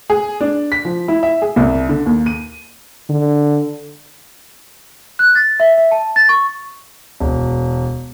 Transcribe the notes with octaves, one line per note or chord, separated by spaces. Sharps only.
G#4
D4
B6
F3
E4
E5
G#4
C2
D3
D#2
D#7
D3
F#6
A6
E5
E5
A5
A6
C#6
E1